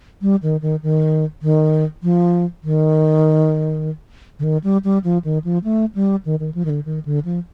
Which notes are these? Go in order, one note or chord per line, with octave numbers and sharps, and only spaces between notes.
G3
D#3
D#3
D#3
D#3
F3
D#3
D3
D#3
G3
G3
F3
D#3
F3
A3
G3
D#3
D#3
F3
D#3
D3
D#3
D3
F3